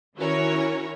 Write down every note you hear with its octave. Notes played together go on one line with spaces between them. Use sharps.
D#3 C#4 E4 F#4 A#4 C#5